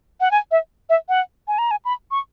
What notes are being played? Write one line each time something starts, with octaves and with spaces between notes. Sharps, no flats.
F#5
G#5
E5
E5
F#5
G#5
A#5
G#5
B5
C#6